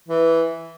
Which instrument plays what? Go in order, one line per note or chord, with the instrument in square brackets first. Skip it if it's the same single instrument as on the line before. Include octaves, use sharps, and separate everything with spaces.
[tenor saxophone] E3